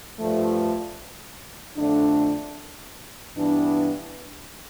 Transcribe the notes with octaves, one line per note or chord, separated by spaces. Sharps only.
G2 F3 A3
F2 D3 A3 D4
G2 E3 B3 D4